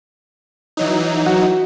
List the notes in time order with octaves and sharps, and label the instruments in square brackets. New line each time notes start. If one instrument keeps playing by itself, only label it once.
[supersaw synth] E3 F#3 D#4
[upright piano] F#4